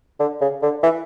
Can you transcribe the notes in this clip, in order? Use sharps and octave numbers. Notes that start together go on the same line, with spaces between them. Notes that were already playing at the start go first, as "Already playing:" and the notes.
D3
C#3
D3
E3